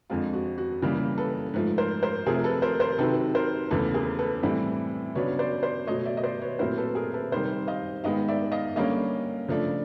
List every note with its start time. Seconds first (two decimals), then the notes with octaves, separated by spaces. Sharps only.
0.10 F2 D3 F3 G#3 F4
0.33 F#4
0.58 F#4
0.82 C#3 E3 G3 A#3
1.18 A4 B4
1.54 G#2 F3 A3
1.78 A#4 C5
2.02 A#4 C5
2.26 C3 F3 A3 G#4 A#4
2.44 A4 B4
2.62 A#4 C5
2.80 A#4 C5
2.99 C3 D#3 F#3 A4 B4
3.35 A#4 C5
3.71 E2 C#3 E3 A3 A4 B4
3.94 G#4 A#4
4.19 A4 B4
4.43 A2 E3 G3 C4 E4
5.15 C#3 F#3 B3 D4 B4 C#5
5.39 C5 D5
5.63 C5 D5
5.87 B2 F#3 A3 C#5 D#5
6.05 D5 E5
6.17 D#5
6.23 C5 D5
6.42 B4 C#5
6.59 A#2 F#3 A3 C4 E4 A#4 C5
6.77 A4 B4
6.95 G#4 A#4
7.14 A4 B4
7.32 C3 D#3 G3 A#4 C5
7.68 D#5 F5
8.04 G#2 D#3 G#3 B3 D#5 F5
8.28 D5 E5
8.52 D#5 F5
8.76 D3 G3 A#3 C#4 D#5 F5
9.48 C#3 F3 A3 D4